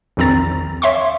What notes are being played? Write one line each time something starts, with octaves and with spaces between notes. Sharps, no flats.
A#1 E2 D#3 C4 A#5 A6
C#5 E5 F5 C6 C#6